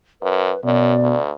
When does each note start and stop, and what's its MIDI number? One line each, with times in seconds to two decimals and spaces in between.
0.22 0.52 42
0.22 0.64 71
0.64 0.94 42
0.64 1.15 47
0.64 1.22 74
0.99 1.32 38